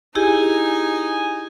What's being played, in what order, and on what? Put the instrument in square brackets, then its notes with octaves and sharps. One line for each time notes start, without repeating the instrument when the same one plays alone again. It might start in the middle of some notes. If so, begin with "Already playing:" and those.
[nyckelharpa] D#4 G#5 [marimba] E4 G4 G#4